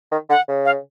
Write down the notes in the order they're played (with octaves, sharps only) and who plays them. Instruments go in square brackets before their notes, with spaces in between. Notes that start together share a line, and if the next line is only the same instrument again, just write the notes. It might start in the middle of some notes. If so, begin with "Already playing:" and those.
[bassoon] D#3
[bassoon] D3 [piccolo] F#5
[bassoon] C#3
[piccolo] F5